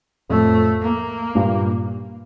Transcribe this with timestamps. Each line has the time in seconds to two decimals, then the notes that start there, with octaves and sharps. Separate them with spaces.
0.30 F2 A2 A3
0.83 A#3
1.35 G2 A#2